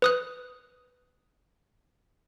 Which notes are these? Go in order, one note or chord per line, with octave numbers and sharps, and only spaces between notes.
B4 D#6 F#6